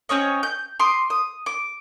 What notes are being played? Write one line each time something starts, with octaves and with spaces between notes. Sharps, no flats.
C4 C#4 C#5 D#5
G6
C6 D6 D#6
D#6
D6